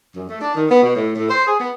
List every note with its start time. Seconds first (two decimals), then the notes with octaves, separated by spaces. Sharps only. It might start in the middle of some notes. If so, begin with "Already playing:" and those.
0.15 F#2
0.29 A3
0.41 D4
0.55 D#3
0.70 B3
0.83 B2
0.95 A2
1.16 A2
1.29 C5
1.47 G#4
1.60 B3